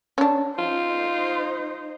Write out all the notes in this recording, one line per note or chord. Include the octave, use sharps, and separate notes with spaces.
C#4 D4
D#4 F4 C5